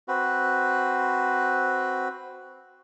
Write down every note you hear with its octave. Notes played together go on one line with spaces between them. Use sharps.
C4 F#4 B4